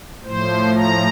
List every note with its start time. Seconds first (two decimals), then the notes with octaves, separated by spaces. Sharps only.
0.24 A2 F3 C5
0.76 A#5